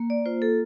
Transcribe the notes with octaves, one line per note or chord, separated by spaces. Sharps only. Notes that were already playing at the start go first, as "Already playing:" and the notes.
Already playing: A#3
D5
F4 C5
A4